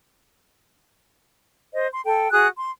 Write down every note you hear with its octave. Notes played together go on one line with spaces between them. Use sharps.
C5 D#5
C6
A4 G5
F#4 G#4 D#6 F#6
C6